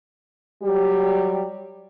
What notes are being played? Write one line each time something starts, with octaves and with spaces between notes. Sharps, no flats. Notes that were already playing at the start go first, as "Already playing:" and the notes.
F#3 G3 G4